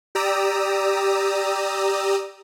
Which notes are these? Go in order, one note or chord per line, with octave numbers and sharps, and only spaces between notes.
G4 D5 A#5 D#6 E6